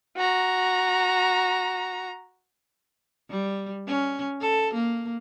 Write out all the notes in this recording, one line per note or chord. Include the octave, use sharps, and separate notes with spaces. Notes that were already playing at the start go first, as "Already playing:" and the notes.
F#4 A#5
G3
C#4
A4
A#3